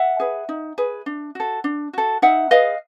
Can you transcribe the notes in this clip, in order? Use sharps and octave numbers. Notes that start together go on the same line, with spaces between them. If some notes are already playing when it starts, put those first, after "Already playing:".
Already playing: E5 F#5
G#4 B4
D#4
G#4 B4
D4
F#4 A4
D4
F#4 A4
D#4 E5 F#5
G#4 B4 D#5 F5